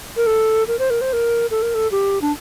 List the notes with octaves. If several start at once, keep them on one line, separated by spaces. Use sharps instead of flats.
A#4
A4
A#4
C5
A#4
C5
A#4
A4
A#4
A4
G4
D4